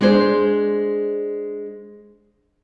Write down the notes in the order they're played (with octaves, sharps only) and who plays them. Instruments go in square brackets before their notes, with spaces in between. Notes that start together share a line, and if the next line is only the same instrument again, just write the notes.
[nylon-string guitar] G#3 D4 G#4 C5